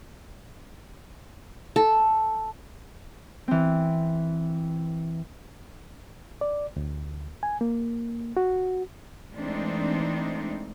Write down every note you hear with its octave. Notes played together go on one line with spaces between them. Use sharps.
A4
E3 C4
D5
D2
G#5
A#3
F#4
E3 G#3 A3 C4 D4 D#4